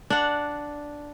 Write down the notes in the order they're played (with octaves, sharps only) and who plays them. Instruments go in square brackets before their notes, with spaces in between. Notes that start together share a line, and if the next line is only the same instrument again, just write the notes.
[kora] D4 F#5